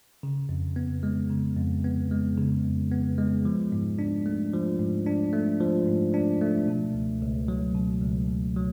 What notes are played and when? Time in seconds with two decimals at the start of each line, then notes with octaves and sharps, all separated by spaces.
0.23 C#3
0.49 F2
0.76 B3
1.03 G#3
1.30 C#3
1.57 F2
1.84 B3
2.11 G#3
2.37 C#3
2.65 F2
2.92 B3
3.18 G#3
3.45 F3
3.72 G#2
3.99 D4
4.26 A3
4.53 F3
4.79 G#2
5.06 D4
5.33 A3
5.60 F3
5.87 G#2
6.14 D4
6.42 A3
6.68 B2
6.95 C#2
7.22 C#2
7.48 F#3
7.75 B2
8.02 C#2
8.29 C#2
8.56 F#3